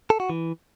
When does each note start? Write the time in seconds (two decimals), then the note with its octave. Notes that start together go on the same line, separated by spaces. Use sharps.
0.10 A4
0.20 F#4
0.30 E3